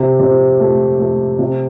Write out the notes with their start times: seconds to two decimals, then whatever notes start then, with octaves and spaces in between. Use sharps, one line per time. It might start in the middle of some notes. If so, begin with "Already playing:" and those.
Already playing: C3
0.20 C3
0.60 A3
0.99 A3
1.39 C3